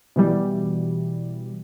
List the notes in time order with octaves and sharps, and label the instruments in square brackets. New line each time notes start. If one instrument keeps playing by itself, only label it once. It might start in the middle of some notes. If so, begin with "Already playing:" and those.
[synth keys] B2 E3 G3